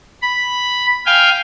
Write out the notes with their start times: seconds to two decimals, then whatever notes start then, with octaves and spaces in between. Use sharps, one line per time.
0.22 B5
1.06 F5 G5 G#5